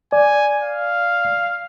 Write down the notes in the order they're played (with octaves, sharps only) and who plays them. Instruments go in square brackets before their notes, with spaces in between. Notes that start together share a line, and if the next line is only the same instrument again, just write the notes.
[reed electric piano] D5 [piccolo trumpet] G#5
[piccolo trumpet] F5